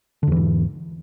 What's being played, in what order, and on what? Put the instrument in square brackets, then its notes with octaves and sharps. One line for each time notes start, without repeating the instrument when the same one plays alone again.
[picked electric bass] D3
E2
E3
G#2